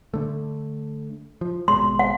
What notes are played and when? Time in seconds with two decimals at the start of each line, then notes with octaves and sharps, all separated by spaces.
0.14 D3 A3
1.41 F3
1.68 G#1 B2 G#3 C6
1.99 F#5